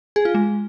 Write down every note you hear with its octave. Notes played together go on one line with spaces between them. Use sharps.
G#4
F4
G#3